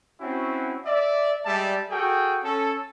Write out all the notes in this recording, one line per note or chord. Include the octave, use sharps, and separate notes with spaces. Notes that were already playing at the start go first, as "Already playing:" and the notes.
C4 C#4 E4 F#4
D5 E5
G3 G#3 D5 E5 A5
F#4 G#4 A4 G5
C#4 A4